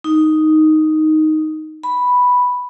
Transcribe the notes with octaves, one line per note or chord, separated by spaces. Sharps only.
D#4
B5